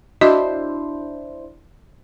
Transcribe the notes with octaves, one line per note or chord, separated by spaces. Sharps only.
D4 E4 F#4 C5 D#5